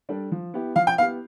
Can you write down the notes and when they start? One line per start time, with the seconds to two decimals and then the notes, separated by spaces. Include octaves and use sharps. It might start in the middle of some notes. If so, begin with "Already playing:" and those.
0.09 G3 D4 A4
0.32 F3
0.54 B3 E4 G4
0.76 F3 F5
0.87 G5
0.98 B3 E4 G4 F5